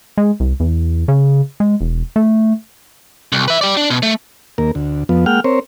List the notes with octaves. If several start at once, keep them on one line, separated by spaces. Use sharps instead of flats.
G#3
C2
E2
C#3
G#3
E1
A3
C2
B4 E5
G4 D5
D4
B2
A3
D#2 A#3 A#4
D2
F2 F3 B3
G#3 A#3 F#5 G5 F6
C4 A#4 C5 C#5